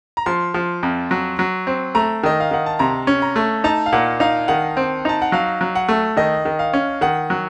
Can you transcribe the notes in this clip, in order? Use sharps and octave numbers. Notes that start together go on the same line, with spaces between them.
A#5
F3 C6
F3
F2
F#3
F#3
C4
A3 A#5
D#3 D#5
F5
D#3 F#5
A5
C3 A#5
C#4
A#5
A3
D#4 A5
F5
A#2 F#5
D#4 F5
D#3 F#5
C4
D#4 A5
F#5
F#3 F5
F#3
F#5
A3
D#3 D#5
D#3
F5
C#4
D#3 F#5
F#3